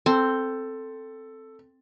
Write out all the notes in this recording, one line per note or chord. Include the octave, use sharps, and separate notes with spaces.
C4 A4